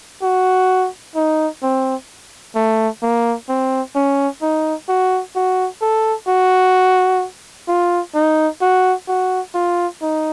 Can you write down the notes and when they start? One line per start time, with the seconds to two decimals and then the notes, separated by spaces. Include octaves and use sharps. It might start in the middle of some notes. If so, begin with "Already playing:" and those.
0.23 F#4
1.16 D#4
1.63 C4
2.56 A3
3.03 A#3
3.49 C4
3.96 C#4
4.42 D#4
4.89 F#4
5.36 F#4
5.82 A4
6.28 F#4
7.68 F4
8.15 D#4
8.61 F#4
9.08 F#4
9.55 F4
10.02 D#4